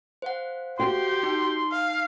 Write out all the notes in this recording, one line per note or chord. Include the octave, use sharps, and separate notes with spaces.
C5 F5 F#5
F#4 G4 G5 C6
D#4
F5